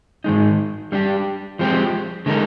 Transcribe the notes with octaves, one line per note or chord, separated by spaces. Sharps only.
G#2 D#3 G#3 D#4
G3 D4 G4
F3 G#3 C4 G4
D3 G#3 D#4 A#4